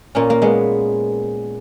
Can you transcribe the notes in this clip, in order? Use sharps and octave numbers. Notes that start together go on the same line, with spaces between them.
A#2 A#3 C#4
A#3
G#3 B3